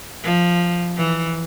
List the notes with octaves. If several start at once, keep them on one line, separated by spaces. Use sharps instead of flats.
F3
E3